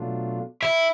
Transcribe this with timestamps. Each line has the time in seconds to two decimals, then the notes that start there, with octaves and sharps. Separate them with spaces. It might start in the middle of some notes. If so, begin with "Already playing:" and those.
Already playing: B2 F#3 A3 D4 F4
0.63 E4